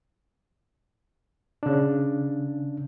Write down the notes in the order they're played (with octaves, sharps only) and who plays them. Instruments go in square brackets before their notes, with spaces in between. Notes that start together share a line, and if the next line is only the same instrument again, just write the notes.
[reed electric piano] C#3 D4